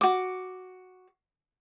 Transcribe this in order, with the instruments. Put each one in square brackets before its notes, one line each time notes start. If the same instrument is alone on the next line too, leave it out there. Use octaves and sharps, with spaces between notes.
[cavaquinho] F#4 D6